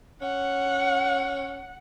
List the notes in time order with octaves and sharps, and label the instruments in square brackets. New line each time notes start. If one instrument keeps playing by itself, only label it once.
[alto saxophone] C#4 [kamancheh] F#5